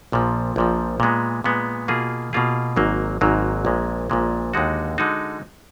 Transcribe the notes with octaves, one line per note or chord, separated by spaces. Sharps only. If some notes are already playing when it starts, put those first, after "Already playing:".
A#1 A#2 F3
A#1 A#2 F3
A#2 G#3 B3
A#2 G#3 B3
B2 A#3 F4 G#4
B2 A#3 F4 G#4
G#1 G#2 F#3 A#3
G#1 G#2 F#3 A#3
A#1 A#2 G#3
A#1 A#2 G#3
D#2 D3 G#3 D#4 F#4
D3 G#3 D#4 F#4